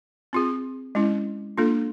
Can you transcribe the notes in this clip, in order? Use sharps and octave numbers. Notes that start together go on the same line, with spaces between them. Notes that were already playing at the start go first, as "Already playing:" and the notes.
C4 F4 G#4
G#3 C#4 E4
A#3 D4 F4 A4